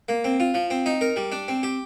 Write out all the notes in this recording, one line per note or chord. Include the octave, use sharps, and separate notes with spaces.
A#3
C4
F4
F3
C4
D#4
A#4
G3
D4
C4
G4